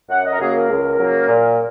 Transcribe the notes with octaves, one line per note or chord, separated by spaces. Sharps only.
F#2 F#5
D#5
A#4
C#3 F#3 A#3 G#4
A#4
C#2
C#3 F#3 A#3
A#2